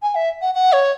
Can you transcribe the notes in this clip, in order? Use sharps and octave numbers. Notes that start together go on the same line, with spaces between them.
G#5
E5
F#5
F#5
C#5